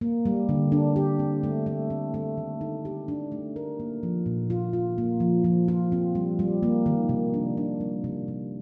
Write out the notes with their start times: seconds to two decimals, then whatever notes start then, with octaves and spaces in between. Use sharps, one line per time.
0.01 A#3
0.26 G3
0.49 D3
0.72 D4
0.96 G4
1.19 C4
1.43 A3
1.66 A3
1.90 C4
2.14 A3
2.37 D#3
2.61 D#4
2.85 G4
3.08 D4
3.32 A3
3.56 A#4
3.80 A#3
4.03 F3
4.26 A#2
4.50 F4
4.73 F4
4.98 A#3
5.20 F3
5.44 F3
5.68 F4
5.92 C4
6.15 G3
6.39 G3
6.63 A#3
6.86 D#3
7.09 C3
7.34 D4
7.57 D4
7.81 G3
8.04 C3
8.28 C3